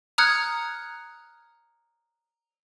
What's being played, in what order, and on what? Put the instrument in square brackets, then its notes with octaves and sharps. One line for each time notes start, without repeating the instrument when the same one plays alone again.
[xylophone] A#5 D#6 F6 F#6 G#6 C#7